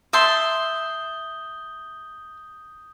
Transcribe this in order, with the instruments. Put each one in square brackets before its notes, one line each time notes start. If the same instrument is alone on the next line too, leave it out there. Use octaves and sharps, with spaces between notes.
[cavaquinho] E5 A5 C6 [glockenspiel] D#6 G6 G7